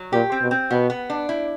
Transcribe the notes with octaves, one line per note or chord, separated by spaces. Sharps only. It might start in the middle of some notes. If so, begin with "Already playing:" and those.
Already playing: F#3
A#2 G4
C4
B2
C4
B2 B3
B3
D4
E4